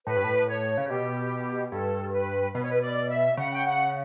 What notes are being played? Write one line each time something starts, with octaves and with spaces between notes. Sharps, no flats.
A2 B4
G2
A2
C#5
C#3
B2 G4
G2 A4
A4
B4
B2 B4
C#5
B4
D5
E5
C#3 F#5
G5
F#5